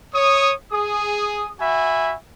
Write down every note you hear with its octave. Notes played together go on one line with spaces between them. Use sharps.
C#5 D#6
G#4 D#6
F#4 E5 G#5 B5